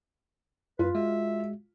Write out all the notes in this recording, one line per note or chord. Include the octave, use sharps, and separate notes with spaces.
F#2 F4 B4
G#3 F#4 E5